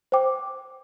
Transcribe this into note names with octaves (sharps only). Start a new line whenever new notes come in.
C5 G5 D6